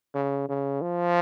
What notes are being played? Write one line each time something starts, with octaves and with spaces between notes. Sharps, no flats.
C#3
C#3
F3